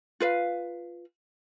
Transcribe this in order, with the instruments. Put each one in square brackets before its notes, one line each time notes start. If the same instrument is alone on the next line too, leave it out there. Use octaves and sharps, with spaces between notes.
[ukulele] F4 B4 F5